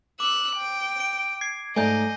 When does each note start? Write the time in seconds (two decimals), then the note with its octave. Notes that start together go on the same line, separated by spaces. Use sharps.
0.20 D6 E6 F#6
0.56 G5
1.00 D7
1.41 G#6 C7
1.76 G#2 A3 D5 D#5 G#5 A#5 G6